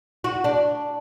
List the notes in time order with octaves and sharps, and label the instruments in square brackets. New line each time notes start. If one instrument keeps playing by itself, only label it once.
[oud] F#4
D4